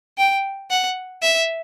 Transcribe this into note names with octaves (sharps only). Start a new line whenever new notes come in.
G5
F#5
E5